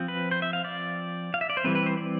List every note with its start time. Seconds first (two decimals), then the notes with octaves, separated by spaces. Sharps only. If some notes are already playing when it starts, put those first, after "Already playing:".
Already playing: F3 C4
0.08 B4
0.31 C5
0.42 E5
0.53 F5
0.64 D5
1.34 F5
1.41 E5
1.50 D5
1.57 C5
1.64 E3 G3 C4 B4
1.75 B4
1.86 C5
1.97 D5